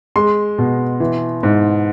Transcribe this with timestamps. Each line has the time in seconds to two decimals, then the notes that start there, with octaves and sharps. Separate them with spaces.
0.16 G#3 C6
0.58 B2
1.00 E3
1.43 G#2